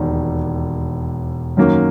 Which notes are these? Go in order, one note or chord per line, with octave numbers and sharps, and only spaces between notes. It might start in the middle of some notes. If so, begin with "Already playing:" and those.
Already playing: E1 D#2 D#3
F#2 D#3 F#3 A#3 C#4